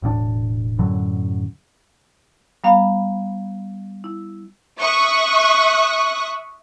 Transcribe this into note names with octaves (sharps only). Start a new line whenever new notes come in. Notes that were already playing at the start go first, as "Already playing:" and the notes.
E1 A2 A#3 D4
F#2 A2 D3 F#3
G3 B3 F5 A#5 B5
E4
E5 C#6 D#6 F#6